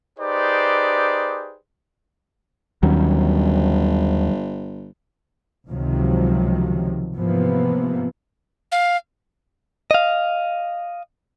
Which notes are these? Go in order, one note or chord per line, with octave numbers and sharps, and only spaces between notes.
D#4 G4 G#4 B4 C5 D5
G1 D#2 D#3 F#3 G3 C#4
C#2 C3 D#3 F3 F#3
G#2 C3 E3 F3 A#3 B3
F5
D#5 F5